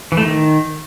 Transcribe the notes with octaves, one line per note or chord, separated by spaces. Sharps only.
E3
A3
D#3